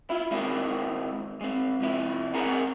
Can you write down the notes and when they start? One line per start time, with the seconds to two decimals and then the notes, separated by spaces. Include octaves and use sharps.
0.10 E4 F4
0.31 D#3 G#3 C4 E4 F#4 A#4
1.41 G#3 C4
1.80 C3 F3 E4
2.34 C4 G#4 A#4 F#5 G#5 A#5